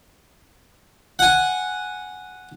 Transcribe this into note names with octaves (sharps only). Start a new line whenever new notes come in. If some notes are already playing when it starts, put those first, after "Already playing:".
F#5 G#5